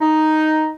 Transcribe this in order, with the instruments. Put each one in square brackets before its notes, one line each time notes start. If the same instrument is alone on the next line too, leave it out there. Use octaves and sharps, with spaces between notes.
[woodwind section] D#4